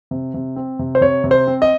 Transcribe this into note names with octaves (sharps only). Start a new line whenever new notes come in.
C3
C3
C4
C3
C5
C3 C#5
C3
C5
C4
D#5